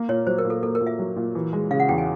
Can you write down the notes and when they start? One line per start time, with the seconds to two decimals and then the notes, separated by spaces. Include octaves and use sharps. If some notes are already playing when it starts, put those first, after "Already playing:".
Already playing: A#3
0.09 A#2 C#5
0.27 F#3 C5
0.38 A#4
0.45 A#2
0.50 A4
0.63 A#3 A4
0.75 A#4
0.81 A#2
0.87 E5
0.99 F#3
1.16 A#2
1.35 E3
1.53 G#3
1.71 C#3 F5
1.80 F#5
1.89 E2 G5
1.98 G#5